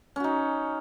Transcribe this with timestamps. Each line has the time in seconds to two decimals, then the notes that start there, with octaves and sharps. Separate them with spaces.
0.16 C#4
0.20 F#4
0.24 D#4